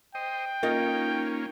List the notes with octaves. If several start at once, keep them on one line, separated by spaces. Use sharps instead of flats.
C5 D#5 G5
A#3 C#4 D#4 F4 A#4